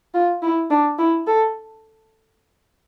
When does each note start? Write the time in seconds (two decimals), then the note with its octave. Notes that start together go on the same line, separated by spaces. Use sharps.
0.14 F4
0.42 E4
0.70 D4
0.99 E4
1.27 A4